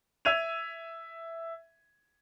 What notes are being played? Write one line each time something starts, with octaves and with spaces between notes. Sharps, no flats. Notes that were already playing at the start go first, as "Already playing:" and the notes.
E5 E6 G#6 D#7 F7